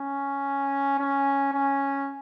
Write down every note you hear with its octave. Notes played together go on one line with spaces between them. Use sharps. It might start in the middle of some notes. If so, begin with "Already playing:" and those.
Already playing: C#4
C#4
C#4